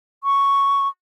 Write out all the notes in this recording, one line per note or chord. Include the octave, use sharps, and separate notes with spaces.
C#6